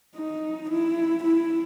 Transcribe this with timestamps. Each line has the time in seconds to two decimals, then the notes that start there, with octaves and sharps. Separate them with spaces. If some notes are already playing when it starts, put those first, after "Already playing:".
0.16 D#4
0.70 E4
1.24 E4